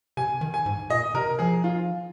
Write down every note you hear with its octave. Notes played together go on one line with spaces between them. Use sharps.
C3 G#5
D#3
G#5
G#2
A#2 D#5
C3 A#4
F3 G#4
F4